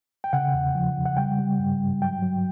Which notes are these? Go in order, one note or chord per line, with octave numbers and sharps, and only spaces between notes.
G5
C#3 F#5
E2
F3
C#3
F#5
G3 G5
G3
G2
G2
F#3 G5
F#3